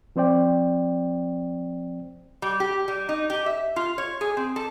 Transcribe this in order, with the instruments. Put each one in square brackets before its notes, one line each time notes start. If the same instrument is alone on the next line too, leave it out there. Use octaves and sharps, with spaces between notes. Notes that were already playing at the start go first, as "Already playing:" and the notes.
[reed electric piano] F3 C4 C5 D5 G5
[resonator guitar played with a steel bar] G3
G4
G3
D#4
G4
E5
F4
C#5
G#4
C4
A4